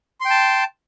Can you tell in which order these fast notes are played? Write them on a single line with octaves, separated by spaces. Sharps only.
C6 G5 A5